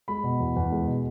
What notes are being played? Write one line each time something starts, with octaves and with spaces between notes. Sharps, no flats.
G#3 B5
B2
E2
E2
G#3
B2